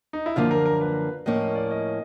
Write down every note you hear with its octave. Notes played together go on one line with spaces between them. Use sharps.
D#4
E4
F#2 D3 F3 A#3 F4
A#4
A#4
B4
A2 F3 A#3 C#4 D#5
D#5
D5
D#5